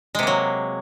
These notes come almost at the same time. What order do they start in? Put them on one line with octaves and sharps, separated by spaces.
G#3 C3 A#3 F#3